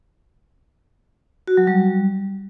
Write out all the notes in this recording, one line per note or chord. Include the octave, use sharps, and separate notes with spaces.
F#4
F#3
G3